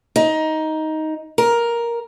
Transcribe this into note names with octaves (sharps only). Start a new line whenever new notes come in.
D#4
A#4